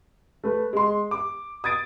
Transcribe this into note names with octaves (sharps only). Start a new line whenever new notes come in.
A3 B4
G#3 C6
D6
D#6 G#6 A6 D7